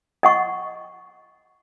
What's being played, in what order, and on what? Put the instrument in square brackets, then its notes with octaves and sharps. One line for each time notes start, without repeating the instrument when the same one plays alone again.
[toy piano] D#5 F#5 C#6